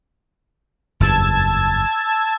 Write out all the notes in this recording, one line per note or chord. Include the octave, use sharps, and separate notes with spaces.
F#1 E2 G2 A5 E6 G#6